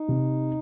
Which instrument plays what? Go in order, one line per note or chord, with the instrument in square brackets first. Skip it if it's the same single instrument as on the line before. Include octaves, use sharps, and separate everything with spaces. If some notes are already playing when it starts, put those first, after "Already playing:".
Already playing: [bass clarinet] D#4
[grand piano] C3